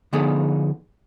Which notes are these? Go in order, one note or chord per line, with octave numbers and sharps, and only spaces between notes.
D3 F3 B3 D#4 G#4 A4